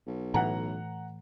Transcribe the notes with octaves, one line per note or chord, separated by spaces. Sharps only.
B1
A2 E3 F#5 A#5